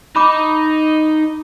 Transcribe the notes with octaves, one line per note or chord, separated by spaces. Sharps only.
D#4 B5 D6